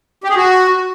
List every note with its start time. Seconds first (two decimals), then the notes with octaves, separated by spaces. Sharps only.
0.24 G4
0.30 G#4
0.36 F#4